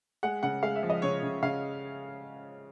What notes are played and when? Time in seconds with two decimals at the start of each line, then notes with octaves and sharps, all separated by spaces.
0.23 G#3 F#5
0.43 C#3 F#5
0.63 G#3 F5
0.76 E5
0.83 F3
0.90 D#5
1.02 C#3 C#5
1.22 C#3
1.42 C#3 F5